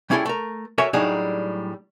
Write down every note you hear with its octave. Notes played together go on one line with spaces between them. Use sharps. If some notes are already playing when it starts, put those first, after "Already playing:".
G3 C#4 E4 G#4 A4 G5
A3 A#4
F#4 A4 A#4 C#5 E5 G#5
A2 F#3 G3 D4 D#4 G#4